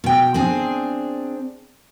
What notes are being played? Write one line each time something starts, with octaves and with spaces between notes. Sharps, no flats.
B2 G5
C4 D4 G#4